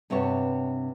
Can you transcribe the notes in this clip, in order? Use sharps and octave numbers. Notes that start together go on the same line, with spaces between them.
G2 C3 B3 C#5 A5